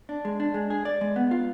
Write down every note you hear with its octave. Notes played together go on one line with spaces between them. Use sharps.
D4
G#3
D4
G#3
G#4
D5
G#3
B3
F4